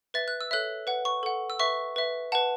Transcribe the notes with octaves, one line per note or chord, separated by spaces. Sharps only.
B4 E5 A6
F#6
E6
A4 C#5 E5 F#6
B4 F#5
C#6
A4 F#5
E6
B4 E5 C#6
B4 E5
B4 F#5 A5